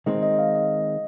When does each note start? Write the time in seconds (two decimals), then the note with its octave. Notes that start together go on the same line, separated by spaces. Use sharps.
0.06 D#3 G#3 C4 D#5
0.23 D#5
0.39 F5
0.55 D#5